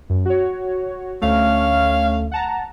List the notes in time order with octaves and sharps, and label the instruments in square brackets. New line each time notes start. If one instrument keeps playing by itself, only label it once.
[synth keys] F#2
F#4 C#5
[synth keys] D2 A3 [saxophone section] C#4 F5
[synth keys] F#5 A5 A#5